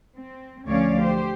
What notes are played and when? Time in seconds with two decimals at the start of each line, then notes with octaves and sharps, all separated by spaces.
0.16 C4
0.68 D2 F3 C#4 C#5 D5 F5
1.02 G4 C5